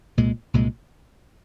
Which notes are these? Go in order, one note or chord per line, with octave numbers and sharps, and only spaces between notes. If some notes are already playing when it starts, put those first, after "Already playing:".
C2 A#2 G#3
C2 A#2 G#3